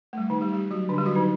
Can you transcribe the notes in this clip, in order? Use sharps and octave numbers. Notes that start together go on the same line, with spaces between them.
A3
G3
D#3 D#4
G3 G4
G3 G4
F#3 F#4
D3 D4
G3 G4
F#3 F#4
D#3 D#4